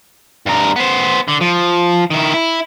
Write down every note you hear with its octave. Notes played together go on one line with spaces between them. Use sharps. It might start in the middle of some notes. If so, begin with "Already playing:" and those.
G2 A#4
B3 C5
D3
F3
D#3 E4
E4